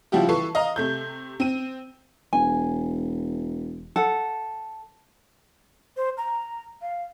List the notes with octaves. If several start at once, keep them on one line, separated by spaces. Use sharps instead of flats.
C#3 F3 G3 E4 F#4 G4
E3 A4 B4 C#6 C7
D#5 F5 A#5
C3 A3 G6
C4 D#7
E1 G#5
A4 F#5
C5
A#5
F5